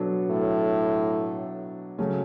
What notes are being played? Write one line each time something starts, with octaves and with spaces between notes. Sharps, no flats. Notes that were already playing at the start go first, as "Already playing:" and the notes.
Already playing: B2 F#3 B3 D4 A4
A2
C#3 F#3 A3 C#4